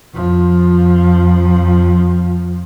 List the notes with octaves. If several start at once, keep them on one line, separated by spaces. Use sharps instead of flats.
F2 F3